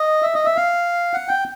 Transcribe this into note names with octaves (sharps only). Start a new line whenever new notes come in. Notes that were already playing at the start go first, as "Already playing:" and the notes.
Already playing: D#5
E5
D#5
E5
F5
F#5
G5